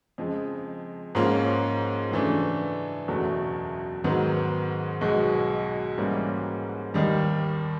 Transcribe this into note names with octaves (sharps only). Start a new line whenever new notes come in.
F2 C#3 F3 G#3
G#2 F3 A#3 C#4 F4
F#2 C#3 E3 A3 D4
F#1 E2 B2 F#3 A3
G#2 D#3 F#3 B3
B1 B2 G#3
G#2 E3 G3 A#3 C#4
D#2 D#3 G3